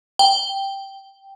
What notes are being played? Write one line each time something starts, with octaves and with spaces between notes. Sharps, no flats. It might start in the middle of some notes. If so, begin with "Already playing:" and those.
G5